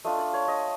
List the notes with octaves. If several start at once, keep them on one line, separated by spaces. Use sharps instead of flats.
A3 D4 F4 D#5
D5
C#5
D#5